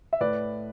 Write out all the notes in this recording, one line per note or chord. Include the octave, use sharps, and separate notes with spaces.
E5
A2 B4 D5